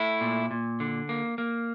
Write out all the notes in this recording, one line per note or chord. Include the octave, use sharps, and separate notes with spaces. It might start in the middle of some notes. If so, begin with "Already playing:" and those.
Already playing: A3 E4
A#2
A#2
D3
A#3
A#3